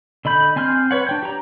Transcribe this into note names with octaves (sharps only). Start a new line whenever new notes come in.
D3 D#5 B5 G6
C4 G#5 C6 F6 G6
B4 C#5 F#5
D4 G5 G6
G4 A#5